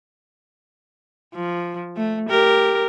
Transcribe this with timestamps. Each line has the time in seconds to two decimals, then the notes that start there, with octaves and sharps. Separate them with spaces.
1.35 F3
1.97 A3
2.29 G4 A#4